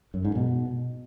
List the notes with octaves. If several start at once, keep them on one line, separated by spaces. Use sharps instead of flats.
F#2
G#2
B2